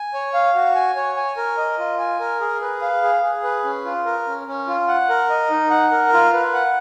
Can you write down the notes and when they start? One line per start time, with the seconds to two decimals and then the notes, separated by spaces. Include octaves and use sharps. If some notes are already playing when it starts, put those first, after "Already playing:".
Already playing: G#5
0.14 C#5
0.34 F5
0.55 F#4
0.75 G#5
0.96 C#5
1.17 G#5
1.37 A#4
1.57 D#5
1.79 F4
1.99 G#5
2.19 A#4
2.41 G#4
2.62 B4
2.82 F5
3.02 G#4
3.23 G#4
3.43 B4
3.64 C#4
3.85 F4
4.06 A#4
4.27 C#4
4.47 C#4
4.67 F4
4.88 F#5
5.09 A#4
5.30 D#5
5.50 D#4
5.70 F#5
5.91 A#4
6.13 F4
6.33 B4
6.54 F#5